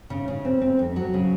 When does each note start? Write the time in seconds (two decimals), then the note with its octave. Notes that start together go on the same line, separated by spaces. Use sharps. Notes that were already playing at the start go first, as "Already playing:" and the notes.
0.10 C#3
0.28 C#3
0.45 C4
0.62 C4
0.79 F2
0.96 F#3
1.14 C#3